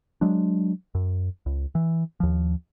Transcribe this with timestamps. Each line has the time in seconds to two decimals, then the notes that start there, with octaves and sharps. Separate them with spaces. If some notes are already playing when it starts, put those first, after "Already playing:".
0.21 F#3 G#3 D4
0.95 F#2
1.46 C#2
1.75 E3
2.20 D#2 F3